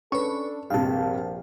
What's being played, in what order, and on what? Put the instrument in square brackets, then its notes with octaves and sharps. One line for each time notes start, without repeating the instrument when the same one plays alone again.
[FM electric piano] C#4 B4 [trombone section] D4 A4 [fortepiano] C#6
[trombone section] A#1 [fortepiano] G2 C3 [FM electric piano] F5 A5